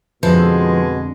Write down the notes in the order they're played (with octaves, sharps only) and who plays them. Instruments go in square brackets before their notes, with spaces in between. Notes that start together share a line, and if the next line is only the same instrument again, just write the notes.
[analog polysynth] F2 D3 [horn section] B2 G#3 [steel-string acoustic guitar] F3 [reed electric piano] B4